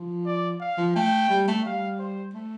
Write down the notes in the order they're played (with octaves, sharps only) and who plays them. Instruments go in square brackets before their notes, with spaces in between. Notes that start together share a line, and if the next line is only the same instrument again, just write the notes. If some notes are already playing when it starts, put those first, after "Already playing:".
Already playing: [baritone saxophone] F3
[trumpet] D5
F5
[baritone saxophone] F3
[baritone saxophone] A3 [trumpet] G5
[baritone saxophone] G3
A3
[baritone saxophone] G3 [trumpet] F5
[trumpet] C5
[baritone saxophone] A3